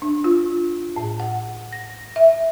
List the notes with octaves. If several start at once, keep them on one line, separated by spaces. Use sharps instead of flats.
D4
F4
A2
F#5
A#6
E5